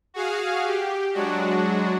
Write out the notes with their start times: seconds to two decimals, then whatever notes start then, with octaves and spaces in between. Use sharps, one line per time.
0.14 F#4 G#4 F5
0.66 G4
1.13 F#3 G#3 D4 F#4